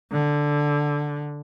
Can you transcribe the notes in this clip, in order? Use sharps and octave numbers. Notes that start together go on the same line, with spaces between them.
D3